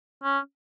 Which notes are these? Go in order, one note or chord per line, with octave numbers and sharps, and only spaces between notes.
C#4